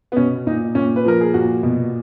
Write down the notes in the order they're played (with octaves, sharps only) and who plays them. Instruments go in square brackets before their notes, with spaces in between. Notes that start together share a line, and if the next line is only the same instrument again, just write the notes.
[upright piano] B3
B2 C#4
A#2 D#4
A#2 C#4
B4
F3 A#4
G#4
A#2 F#4
B2